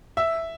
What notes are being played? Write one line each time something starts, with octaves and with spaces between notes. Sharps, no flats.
E5